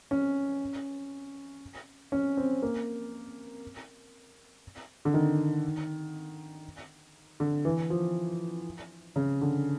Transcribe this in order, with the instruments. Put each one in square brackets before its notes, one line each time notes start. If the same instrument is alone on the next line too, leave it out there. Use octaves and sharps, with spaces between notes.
[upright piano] C#4
C#4
C4
A#3
D3
D#3
D3
E3
F3
C#3
D3